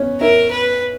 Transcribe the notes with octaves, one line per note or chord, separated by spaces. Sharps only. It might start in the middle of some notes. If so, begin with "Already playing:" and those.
Already playing: B3 C#4 C#5
E4 A#4 E5
B4